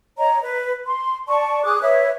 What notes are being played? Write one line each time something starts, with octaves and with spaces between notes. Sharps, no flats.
C#5 D#5 A#5
B4
C6
D5 A5 C#6
G#4 D6 D#6 F#6
B4 C#5 E5